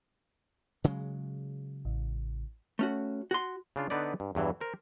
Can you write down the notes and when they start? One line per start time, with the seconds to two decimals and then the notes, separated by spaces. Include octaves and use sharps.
0.84 C#3 F#3 G#3
1.85 A1
2.79 A3 C#4 F#4
3.31 F#4 C6
3.76 C#3 D4 F4
3.90 D3 B3 D#4 B4 C#5 D5
4.20 G2
4.35 E2 G2 E3 F#3
4.60 A#4 C5